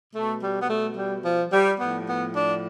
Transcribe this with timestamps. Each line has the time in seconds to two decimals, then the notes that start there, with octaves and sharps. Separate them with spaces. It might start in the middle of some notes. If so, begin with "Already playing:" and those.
0.14 B2 A3
0.42 G3
0.62 B3
0.70 A3
0.97 G3
1.25 F3
1.53 G3
1.80 A2 F3 B3
2.07 B3
2.36 D4